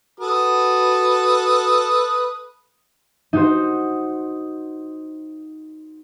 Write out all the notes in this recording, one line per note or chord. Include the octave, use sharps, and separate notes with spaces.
F#4 A4 B4 D#6
D#4 F#4 C5